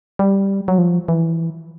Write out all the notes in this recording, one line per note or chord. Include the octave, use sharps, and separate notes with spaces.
G3
F#3
F3
E3